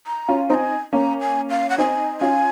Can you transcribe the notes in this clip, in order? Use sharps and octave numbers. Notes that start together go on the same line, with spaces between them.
A#5
C#4 F4
C4 D#4 G#5 A#5
A#3 C#4 A#5
G#5
F5
F#5
C4 D#4 G#5
C#4 F4 G#5